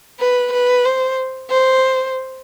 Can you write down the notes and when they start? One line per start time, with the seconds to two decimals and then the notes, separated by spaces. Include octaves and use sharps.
0.20 B4
0.53 B4
0.85 C5
1.50 C5